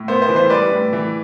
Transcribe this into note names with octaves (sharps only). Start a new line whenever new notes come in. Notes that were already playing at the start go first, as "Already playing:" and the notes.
Already playing: A2
B3 C5
C5
E3
C5
G3 B4 D5
A2
E3